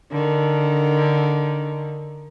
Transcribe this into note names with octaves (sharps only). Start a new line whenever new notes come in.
D3 D#3